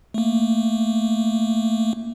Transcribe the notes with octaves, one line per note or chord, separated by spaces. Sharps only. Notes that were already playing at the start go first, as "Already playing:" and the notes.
A3 A#3